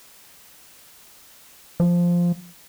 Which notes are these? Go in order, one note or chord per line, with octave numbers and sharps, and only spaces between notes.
F3